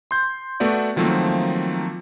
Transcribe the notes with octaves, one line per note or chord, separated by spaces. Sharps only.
C6 G6
A3 B3 F#4 D5
D#3 F3 F#3 A3 A#3 C4